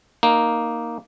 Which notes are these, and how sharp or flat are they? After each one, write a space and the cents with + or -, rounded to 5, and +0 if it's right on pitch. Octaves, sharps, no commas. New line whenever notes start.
A#3 +0 D#4 +0